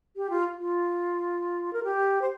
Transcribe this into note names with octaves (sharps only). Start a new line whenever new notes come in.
G4
F4
F4
A#4
G4
C5